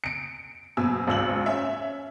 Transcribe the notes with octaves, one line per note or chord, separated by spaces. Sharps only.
C#7 D7
F#1 B2 G#5 E6
G#1 C#2 E6 F#7
C#4 E5